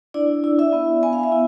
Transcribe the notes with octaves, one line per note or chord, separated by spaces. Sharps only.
D4 E4 D5
E4
E4 E5
B3
B3 G#5
F5
E5
E4